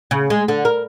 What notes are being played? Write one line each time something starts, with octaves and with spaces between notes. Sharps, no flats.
C#3
G#3
D3
A#4